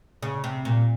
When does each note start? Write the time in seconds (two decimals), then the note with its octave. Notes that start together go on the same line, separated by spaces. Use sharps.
0.22 C#3
0.44 C3
0.65 A#2